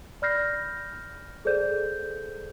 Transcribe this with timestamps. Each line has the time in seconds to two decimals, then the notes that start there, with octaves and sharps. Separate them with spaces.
0.22 D5 B5 F6 G6 A#6 C7
1.45 G#4 A4 C5 D5 G6